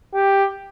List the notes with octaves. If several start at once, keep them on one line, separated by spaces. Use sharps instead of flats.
G4